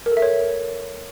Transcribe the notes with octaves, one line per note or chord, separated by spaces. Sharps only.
A#4
A4
E5
C#5